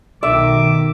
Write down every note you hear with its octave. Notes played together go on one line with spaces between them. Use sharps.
B1 D#3 E5 D6